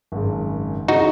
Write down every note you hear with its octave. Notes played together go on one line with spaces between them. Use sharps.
G#1 F#2 C#3
C#3 E3 D#4 F#4